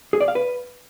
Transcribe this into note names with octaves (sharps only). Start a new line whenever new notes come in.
G#4
D5
F5
B4